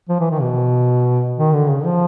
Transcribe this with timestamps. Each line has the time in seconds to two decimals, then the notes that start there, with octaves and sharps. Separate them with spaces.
0.09 F3
0.20 E3
0.31 D#3
0.41 B2
1.37 D#3
1.53 D3
1.70 C#3
1.85 F3